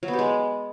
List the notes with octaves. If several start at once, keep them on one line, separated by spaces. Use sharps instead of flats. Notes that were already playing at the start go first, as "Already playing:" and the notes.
F#3
B3
G4
G#3